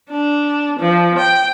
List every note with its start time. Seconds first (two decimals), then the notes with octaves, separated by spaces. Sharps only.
0.10 D4
0.79 F3
1.18 G5